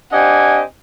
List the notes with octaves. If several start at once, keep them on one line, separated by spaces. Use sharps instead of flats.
C4 D4 G4 D#5 F#5 G#5